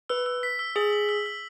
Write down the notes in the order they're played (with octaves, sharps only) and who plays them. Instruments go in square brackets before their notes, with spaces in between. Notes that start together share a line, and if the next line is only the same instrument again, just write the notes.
[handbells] B4 [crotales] E6
[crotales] E6
B6
E6
[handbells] G#4 [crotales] F#7
[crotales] F#7
E6
E6